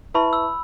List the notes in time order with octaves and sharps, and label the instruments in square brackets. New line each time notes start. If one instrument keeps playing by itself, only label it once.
[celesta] E4 B4 E5 A5 C#6 [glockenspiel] B5
[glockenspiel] E6